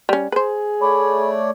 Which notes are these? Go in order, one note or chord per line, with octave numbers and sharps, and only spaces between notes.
G3 C#4
G#4 B4 C5
A3 C#5 D5 B5